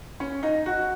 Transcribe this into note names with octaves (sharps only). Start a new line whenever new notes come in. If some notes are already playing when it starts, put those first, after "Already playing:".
C#4
D#4
F#4